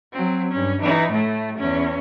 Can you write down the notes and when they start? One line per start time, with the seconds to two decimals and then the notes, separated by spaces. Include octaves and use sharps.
0.13 F#3 C4
0.52 G2 C#4
0.81 E3 D#4
1.11 A2 A3
1.58 E2 C#4